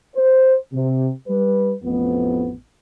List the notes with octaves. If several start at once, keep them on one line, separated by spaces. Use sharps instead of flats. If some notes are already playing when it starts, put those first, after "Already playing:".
C5
C3
G3 B4
A1 F2 B3